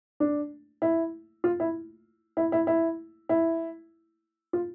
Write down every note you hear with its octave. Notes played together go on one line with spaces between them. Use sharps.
D4
E4
F4
E4
E4
E4
E4
E4
F4